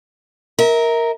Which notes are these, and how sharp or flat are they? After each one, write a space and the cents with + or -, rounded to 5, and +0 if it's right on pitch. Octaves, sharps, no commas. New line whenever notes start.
A#4 +0 E5 -35